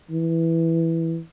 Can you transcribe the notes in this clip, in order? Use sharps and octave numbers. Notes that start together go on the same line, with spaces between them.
E3